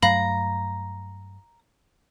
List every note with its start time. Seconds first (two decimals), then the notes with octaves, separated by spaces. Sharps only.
0.03 G2 F#3 A3 F5 A#5 B5